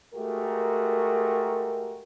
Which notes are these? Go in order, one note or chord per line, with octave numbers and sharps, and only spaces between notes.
G#3 A3 F#4 G4 A#4